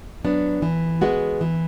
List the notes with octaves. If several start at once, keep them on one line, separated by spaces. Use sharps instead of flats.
F#3 B3 D4
E3
G#3 B3 F#4
E3